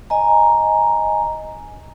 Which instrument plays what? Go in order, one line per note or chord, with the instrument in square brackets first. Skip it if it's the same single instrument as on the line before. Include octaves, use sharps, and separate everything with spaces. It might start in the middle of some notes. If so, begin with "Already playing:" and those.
[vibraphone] D#5 G#5 A#5